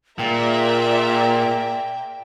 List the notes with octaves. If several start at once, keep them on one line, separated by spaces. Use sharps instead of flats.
A#2 A#3 G#4 A#4 D5 E5 G5 A#5